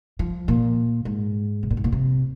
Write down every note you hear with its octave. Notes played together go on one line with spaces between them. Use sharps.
F3
A#2
G#2
C3
A#2
G#2
A#2
C3